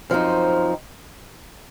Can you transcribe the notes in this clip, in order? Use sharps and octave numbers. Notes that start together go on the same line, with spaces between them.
F#2 F3 C4 D#4